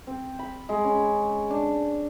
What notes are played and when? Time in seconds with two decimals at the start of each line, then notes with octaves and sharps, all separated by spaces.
0.07 C4
0.39 B5
0.69 G#3
0.84 C#4
1.50 D4